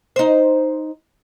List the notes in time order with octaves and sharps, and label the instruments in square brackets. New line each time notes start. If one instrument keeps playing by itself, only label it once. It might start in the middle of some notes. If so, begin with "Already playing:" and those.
[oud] D#4 C5